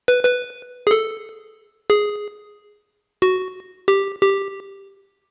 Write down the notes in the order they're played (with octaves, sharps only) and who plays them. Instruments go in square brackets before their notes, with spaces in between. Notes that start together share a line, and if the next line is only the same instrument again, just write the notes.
[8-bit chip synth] B4
B4
G#4
A4
G#4
F#4
G4
G4